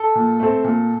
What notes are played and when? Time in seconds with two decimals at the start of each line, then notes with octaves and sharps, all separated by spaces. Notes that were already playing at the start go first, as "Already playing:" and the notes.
Already playing: A4
0.15 A#2
0.40 A3 C4
0.64 A#2